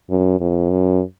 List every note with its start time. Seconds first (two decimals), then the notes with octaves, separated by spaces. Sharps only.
0.10 F#2
0.40 F2
0.70 F#2